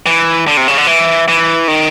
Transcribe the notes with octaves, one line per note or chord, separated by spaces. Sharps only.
E3
D3
C3
C#3
D3
E3
E3
D#3